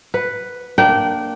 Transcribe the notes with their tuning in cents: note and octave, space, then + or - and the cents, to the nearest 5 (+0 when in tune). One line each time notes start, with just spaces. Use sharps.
B4 +0 F#5 +0
A#3 -5 D4 +0 G5 -25